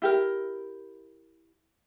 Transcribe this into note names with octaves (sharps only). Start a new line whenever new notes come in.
E4 G4 A#4